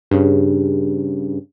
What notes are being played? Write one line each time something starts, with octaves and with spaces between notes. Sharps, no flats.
G2 C#3